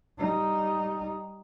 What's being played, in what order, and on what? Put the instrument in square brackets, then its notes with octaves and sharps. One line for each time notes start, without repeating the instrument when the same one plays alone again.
[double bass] G3 D#4